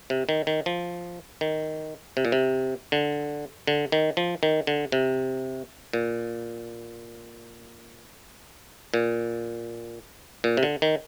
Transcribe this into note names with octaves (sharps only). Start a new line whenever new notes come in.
C3
D#3
D#3
F3
D#3
C3
A#2
C3
D3
D3
D#3
F3
D#3
D3
C3
A#2
A#2
A#2
C3
D3
D#3